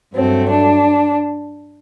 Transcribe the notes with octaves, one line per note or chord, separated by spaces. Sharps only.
G2 F#3 A3 C4
D4